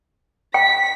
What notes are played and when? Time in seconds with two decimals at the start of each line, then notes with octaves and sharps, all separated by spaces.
0.54 G5 B6